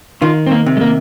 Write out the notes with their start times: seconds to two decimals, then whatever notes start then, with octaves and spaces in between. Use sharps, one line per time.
0.22 D#3 F4
0.47 C4
0.51 A#3
0.66 C3
0.77 G#3
0.81 A#3